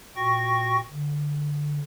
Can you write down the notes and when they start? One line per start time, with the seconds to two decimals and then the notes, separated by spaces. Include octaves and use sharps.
0.16 A#2 F#4 G5 C#6 A#6
0.91 D3